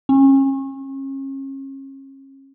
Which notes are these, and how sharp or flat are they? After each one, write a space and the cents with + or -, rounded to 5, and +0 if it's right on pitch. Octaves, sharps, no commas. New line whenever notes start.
C#4 -35